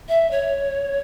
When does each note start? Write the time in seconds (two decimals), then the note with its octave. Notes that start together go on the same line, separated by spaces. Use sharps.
0.09 E5
0.31 C#5